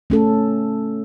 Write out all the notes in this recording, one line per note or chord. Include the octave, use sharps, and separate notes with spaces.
A3 C#4 A4